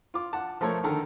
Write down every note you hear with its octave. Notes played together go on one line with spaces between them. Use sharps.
F4 D6
F#5 A5
F3 A3 A4 A#4 C#5
D3 D#3 A4 A#4